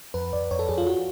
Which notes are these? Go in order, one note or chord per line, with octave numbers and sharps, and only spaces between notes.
F2 B4
F2 D5
F2 C#5
A4
F2 G#4
F4
F#4